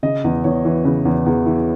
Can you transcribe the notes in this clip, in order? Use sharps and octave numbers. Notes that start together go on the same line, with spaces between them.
C#3 D#5
E2
E2 C#5
E3
C#3 B4
E2
E2 G#4
E3